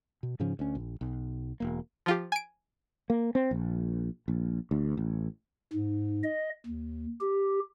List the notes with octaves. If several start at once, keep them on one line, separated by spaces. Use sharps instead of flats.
B2
G#2 C#3 F3 C#4
D2 C#4
A#1
B1
E1 A#3
F3 F4 G4
G#5 D7
A#3
C4
A#1
A#1
D2
A1
G#2
D#5
D#2
G4